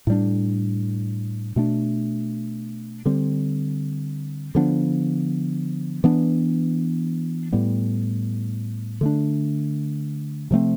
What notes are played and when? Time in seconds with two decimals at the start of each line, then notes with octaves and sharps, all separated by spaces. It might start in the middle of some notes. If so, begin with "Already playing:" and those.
0.07 A2 G3 D4
1.56 B2 A3 D4
3.06 D3 G3 C4
4.55 D3 F3 B3 D4
6.04 E3 B3 D4
7.53 A2 G3 B3
9.01 D3 A3 D4
10.51 C3 F3 A3 C4